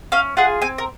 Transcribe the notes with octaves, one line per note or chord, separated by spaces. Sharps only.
C#4 F5
F4 G#4 F#5
C4 G#5
A#4